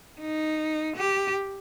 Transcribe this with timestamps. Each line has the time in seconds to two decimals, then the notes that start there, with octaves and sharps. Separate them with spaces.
0.20 D#4
0.96 G4